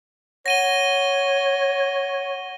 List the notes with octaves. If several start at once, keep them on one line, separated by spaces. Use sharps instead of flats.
C#5 F#5 A#6 D#7 G7